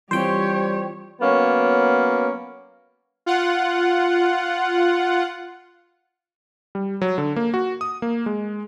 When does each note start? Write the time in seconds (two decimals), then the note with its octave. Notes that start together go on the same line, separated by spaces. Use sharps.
0.11 E3 G3 C4 F4 G4 C5 C#5 G5
1.21 F#3 A#3 B3 C#4
3.26 F4 F#5
6.75 G3
7.02 F#3
7.18 D3
7.36 A#3
7.54 F#4
7.81 D#6
8.02 A#3
8.26 G#3